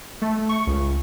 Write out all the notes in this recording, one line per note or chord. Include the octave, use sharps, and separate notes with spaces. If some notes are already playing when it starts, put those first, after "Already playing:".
A3
C#6
C#2